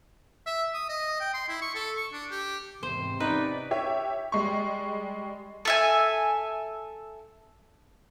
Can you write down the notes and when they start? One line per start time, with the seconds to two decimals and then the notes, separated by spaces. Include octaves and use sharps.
0.47 E5
0.74 D#6
0.89 D#5
1.20 G5
1.34 C6
1.48 E4
1.62 C#6
1.75 A4
1.97 C#6
2.13 D4
2.31 G4
2.83 E2 G#2 C3 C5
3.20 C#4 D#4 B4 D5
3.71 G4 C#5 E5
4.32 G3 G#3 C#6
5.65 A4 E5 G#5